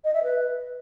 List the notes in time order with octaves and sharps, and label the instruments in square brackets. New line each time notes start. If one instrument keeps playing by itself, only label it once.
[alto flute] D#5
E5
B4